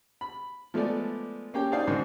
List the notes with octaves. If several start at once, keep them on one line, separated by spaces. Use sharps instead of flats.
B5
F3 G#3 A3 B3 D5
A#3 C#4 G4 G5
C#4 D#4 G#4 C5 D5 F5
G#2 D#3 C4 D4 F#4